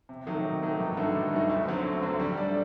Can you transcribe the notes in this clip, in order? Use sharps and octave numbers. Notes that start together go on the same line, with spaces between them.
C3
D#3 F#3 A3 D#4
C3
D#3 F#3 A3 D#4
G2
D3 A3 D#4 F#4
G2
D3 A3 D#4 F#4
D2
D3 F#3 C4
D2
D3 F#3 C4
G3
D4 A4 D5